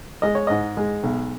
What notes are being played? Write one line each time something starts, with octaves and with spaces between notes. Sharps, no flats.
G#3 D#5
C#5
G#2 D#5
G#3
B1